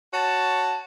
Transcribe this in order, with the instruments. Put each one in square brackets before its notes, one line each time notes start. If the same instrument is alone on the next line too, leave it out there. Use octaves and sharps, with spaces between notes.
[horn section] F#4 C#5 A5